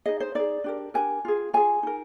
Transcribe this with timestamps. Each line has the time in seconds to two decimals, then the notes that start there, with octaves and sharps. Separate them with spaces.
0.06 D#4 G#4 D#5
0.20 C5
0.35 D#4 G#4 D5
0.64 D4 G4 A#4
0.94 D4 G4 A#4 G#5
1.25 F4 G#4
1.53 F4 G#4 G#5
1.83 D#4 A#4